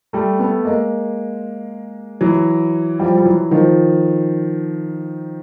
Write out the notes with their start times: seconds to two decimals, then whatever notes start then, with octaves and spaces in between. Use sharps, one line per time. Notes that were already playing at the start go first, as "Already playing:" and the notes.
0.13 G3 A3
0.39 A3 B3
0.65 G#3 A#3
2.21 E3 F#3
2.99 F3 G3
3.18 G3
3.25 E3 F#3
3.51 D#3 F3